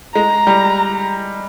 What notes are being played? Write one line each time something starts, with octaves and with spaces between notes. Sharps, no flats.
G#3 A#5
G3